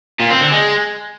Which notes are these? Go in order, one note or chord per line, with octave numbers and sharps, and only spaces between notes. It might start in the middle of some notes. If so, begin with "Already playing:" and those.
A#2
C4
D3
G#3